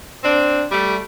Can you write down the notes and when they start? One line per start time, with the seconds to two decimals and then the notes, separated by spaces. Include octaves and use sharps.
0.24 C4 D4
0.72 G3 A3